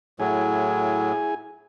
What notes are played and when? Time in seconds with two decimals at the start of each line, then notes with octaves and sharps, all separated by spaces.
0.20 A2 F#3 E4 G#4 G#5